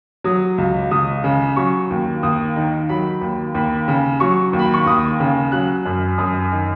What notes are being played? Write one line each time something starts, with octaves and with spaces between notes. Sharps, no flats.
F#3 D#6
C#2
C#2 D#6
C#3
F#3 C#6
D#2
D#2 D#6
D#3
F#3 B5
D#2
D#2 B5
C#3
F#3 C#6
D#2
B5
C#6
D#2 D#6
C#3
F#3 F#6
F#2
F#2 D#6
D#3